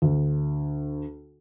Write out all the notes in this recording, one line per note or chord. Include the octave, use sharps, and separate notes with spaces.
D2